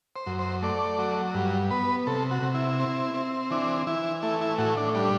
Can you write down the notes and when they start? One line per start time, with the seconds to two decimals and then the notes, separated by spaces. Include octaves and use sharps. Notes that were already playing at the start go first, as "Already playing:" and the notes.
0.16 C5
0.27 F#2
0.39 C5
0.62 A3 D5
0.99 F#3
1.34 G2
1.70 B3 B4
2.07 C3 A4
2.31 F#4
2.42 C3
2.55 E4
2.79 C4
3.14 C4
3.51 E3 D4
3.87 E3 E4
4.22 A3 E4
4.41 E4
4.58 A2 F#4
4.77 D4
4.94 G3 D4